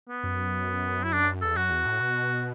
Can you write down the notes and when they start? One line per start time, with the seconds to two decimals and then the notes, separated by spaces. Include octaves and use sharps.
0.09 B3
0.23 F#2
1.03 E4
1.12 D4
1.42 E2 A4
1.56 F#2 F#4
1.71 E2
1.86 A2
2.01 B2